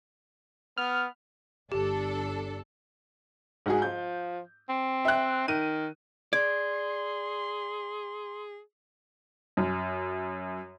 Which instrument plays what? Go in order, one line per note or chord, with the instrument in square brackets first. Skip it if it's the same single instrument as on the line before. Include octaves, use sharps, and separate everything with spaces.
[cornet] B3 [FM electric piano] F6
[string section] G1 D4 A4 [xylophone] G4
[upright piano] G#2 F#4 G#4
[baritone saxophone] F3 [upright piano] G6
[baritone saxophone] C4
[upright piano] E5 G5 F#6
[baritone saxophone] D#3 [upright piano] D#7
[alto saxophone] G#4 [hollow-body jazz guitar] D5 [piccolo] C6 [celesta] G#6
[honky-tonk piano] F#2